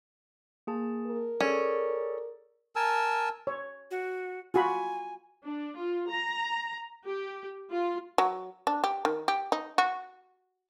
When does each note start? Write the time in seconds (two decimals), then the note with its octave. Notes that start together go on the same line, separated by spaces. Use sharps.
0.67 A#3 G#4 A5
1.07 A#4
1.40 C#4 G#4 A4 D5
2.76 A#4 G#5 A5 E6
3.47 C#5
3.91 F#4
4.54 F4 F#4 G#5 B5
5.43 D4
5.77 F4
6.09 A#5
7.05 G4
7.69 F4
8.18 F#3
8.67 D4
8.84 G4
9.05 D#3
9.28 G4
9.52 D#4
9.78 F#4